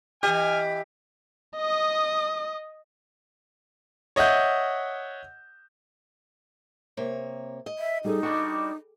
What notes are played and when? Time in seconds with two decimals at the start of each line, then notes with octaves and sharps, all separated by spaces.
0.23 E3 G4 D#5 G#5 F6
1.56 D#5 D#6
4.16 C#5 D#5 E5 F#5 G6
6.97 C3 A#3 C#5
7.66 D#5
7.79 E5
8.04 G3 D#4 G#4 A4
8.23 G3 D4 F#4 G5